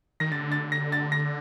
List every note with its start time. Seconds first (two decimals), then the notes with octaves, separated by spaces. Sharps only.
0.20 D#3 A#6
0.32 D3 A6
0.52 A6
0.72 A#6
0.92 A6
1.12 A#6